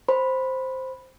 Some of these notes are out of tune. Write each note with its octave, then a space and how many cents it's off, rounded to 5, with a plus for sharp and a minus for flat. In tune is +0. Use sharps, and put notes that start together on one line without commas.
C5 +0 B5 +0